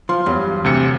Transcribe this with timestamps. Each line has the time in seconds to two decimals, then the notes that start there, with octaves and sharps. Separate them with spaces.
0.09 F3 C6
0.26 E2 G2 F#3
0.64 D2 C3 C#7